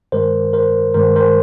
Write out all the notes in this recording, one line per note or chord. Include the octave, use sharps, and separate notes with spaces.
G2 D#3 G#3 A#4 C5
A#4 C5
G2 D#3 G#3 A#4 C5
A#4 C5